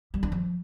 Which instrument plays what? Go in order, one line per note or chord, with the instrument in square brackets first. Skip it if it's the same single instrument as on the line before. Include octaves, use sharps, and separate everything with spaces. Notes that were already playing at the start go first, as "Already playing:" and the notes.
[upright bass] G3
D4
F3